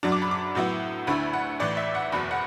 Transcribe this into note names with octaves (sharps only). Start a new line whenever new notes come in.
F#2 F#3 D4
D6
B5
D6
A2 F#3 B3 E4
D2 D3 A3 E4 B5
F#5
A1 A2 E3 D5
E5
F#5
F#1 E2 B2 B5
F#5